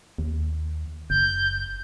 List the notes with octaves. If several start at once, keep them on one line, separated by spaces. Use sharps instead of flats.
D#2
F#1 G6